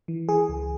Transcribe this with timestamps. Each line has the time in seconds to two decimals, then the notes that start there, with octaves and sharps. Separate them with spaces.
0.08 E3
0.28 E3 G#4
0.49 C#2